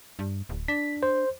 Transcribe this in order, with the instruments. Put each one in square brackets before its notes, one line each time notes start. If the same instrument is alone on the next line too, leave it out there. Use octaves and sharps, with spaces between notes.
[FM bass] G2
D1
[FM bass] D4 [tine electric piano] B6
[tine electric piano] C5